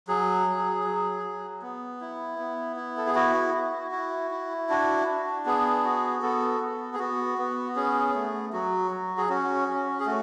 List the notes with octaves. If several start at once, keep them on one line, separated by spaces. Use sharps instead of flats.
F#3 G#4
F#3
F#3
F#3
B3
E4
B3
E4
A4
G#4
E4 F#4
E4
E4
E4
D4 F#4
D4
B3 G#4
F#4
B3 A4
B3
G#4
B3 F#4
B3
C#4 G#4
A3
F#3 F#4
F#3
G#4
C#4 F#4
C#4
G#4
A3 F#4